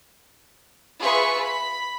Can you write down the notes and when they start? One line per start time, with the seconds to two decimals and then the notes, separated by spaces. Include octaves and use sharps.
1.00 F4 G#4 B4 E5 C#6
1.40 B5